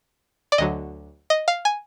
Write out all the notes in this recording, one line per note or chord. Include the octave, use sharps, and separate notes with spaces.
D5
D2 D3 F#3 D#5
D#5
F5
G#5